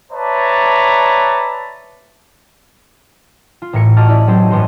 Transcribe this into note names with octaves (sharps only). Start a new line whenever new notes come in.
B4 C#5 D5 E5 A5 A#5
F4
A1 A2 A#4 C#7
F4 F#4 D#5 A5 D6 F6
C#4 E4 D5 D#5
F#3 C#4 G4 A4 C5 D#5
A1 G2 B3 F#4 C6 D#7